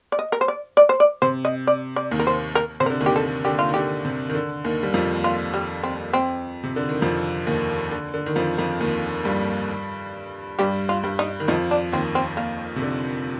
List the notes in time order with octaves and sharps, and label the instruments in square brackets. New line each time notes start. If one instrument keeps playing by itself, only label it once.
[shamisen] D5
D#5
A#4
C5
D5
D5
C5
D5
[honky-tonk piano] C3 [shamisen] C5
[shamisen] D#5
D5
D5
[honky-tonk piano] D#2 D#3
[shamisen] A#4
C5
A#4
[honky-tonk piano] C3 [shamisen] C5
[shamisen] A#4
[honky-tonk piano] D3
D#2 D#3
[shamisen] G4
A4
[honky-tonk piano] D3 [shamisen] G4
[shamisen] F4
[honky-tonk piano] D#3
[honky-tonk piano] D3 [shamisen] G4
[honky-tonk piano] C3
D#3
D3
D#2 D#3
G3
F2 F3
[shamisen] F4
G3
C4
C4
[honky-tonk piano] C3
D3
D#3
F2 F3
D#2 D#3
D3
D3
D#3
F2 F3
F2 F3
D#2 D#3
G2 G3
[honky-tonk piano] G2 G3 [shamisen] G4
[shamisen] F4
[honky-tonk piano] G2 G3
[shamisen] D#4
[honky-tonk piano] D#3
[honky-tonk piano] F2 F3 [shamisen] D#4
[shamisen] D4
[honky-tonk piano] D#2 D#3 [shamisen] C4
[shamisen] C4
A#3
[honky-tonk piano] C3
D3